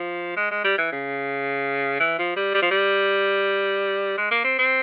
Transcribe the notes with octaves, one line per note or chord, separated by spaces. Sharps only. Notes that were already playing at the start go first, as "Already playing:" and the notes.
Already playing: F3
G#3
G#3
G3
E3
C#3
E3
F3
G3
G3
F3
G3
G#3
A#3
C4
C4